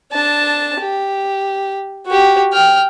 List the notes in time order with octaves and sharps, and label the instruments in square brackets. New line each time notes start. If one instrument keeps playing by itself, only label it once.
[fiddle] D4 A5
G4
F#4 G4
G5 F6